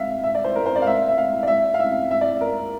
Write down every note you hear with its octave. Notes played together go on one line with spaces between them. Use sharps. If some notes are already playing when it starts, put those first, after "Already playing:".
Already playing: E5 F5
E5
D5
C5
A#4
C5
D5
F5
E5
E5
F5
D5
E5
F5
E5
E5
D5
A#4